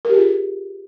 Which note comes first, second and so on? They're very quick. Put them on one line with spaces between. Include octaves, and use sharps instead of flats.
A#4 G4 G#4 F4